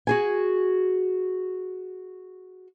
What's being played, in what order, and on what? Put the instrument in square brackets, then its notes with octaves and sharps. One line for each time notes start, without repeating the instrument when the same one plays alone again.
[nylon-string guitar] F#4 G#4 G#5